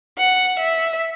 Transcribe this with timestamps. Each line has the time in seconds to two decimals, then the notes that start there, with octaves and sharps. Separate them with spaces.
0.18 F#5
0.59 E5